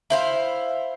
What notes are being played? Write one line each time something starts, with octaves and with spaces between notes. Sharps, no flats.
E4 C5 F5